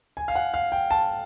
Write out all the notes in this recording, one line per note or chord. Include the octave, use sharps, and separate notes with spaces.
G#5
F5
F#5
F5
G5
A5